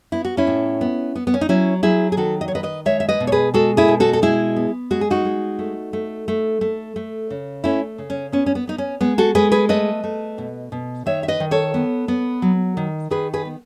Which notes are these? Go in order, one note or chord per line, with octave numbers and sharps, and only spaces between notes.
B3 E4
F#4
C#4 E4
A2
B3
B3
B3
C#4
D#4
F#3 C#4 E4
F#3 E4 G#4
G#4
D#3 F#4 A4
D#5
C#5
D#3 B4 D#5
B4 D#5
G#3 C#5 E5
E5
B4 D#5
B2
C#5
G#4 B4
G#3 F#4 A4
E4 G#4
B2
F#4 A4
A4
G#3 E4 G#4
B3
G#3 F#4
G#4
D#4 F#4
G#3
A3
A3
A3
A3
A3
C#3
A3 C#4 E4
C#3
C#4
B3 C#4
C#4
B3
B3 D#4
C#4
G#3 B3
F#4 A4
G#3 G#4 B4
G#4 B4
A3 B4 D#5
A3
B2
B2
D#3 C#5 E5
E5
B4 D#5
D#3
A4 C#5
B3
B3
F#3
D#3
D#3 G#4 B4
G#4 B4
B3